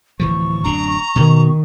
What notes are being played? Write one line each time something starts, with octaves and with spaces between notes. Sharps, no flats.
D1 E3 F3 C#6
D1 F#2 D4 A#5
B2 D#3